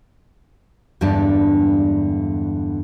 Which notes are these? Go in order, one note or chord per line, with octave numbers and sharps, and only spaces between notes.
E2 G2 D3 G#3 D4 A5